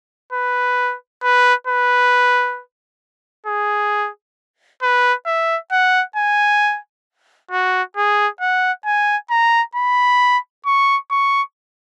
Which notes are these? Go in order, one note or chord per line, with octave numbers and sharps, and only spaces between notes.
B4
B4
B4
G#4
B4
E5
F#5
G#5
F#4
G#4
F#5
G#5
A#5
B5
C#6
C#6